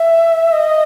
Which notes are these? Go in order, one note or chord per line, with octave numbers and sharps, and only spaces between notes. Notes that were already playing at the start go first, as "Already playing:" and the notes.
Already playing: E5
D#5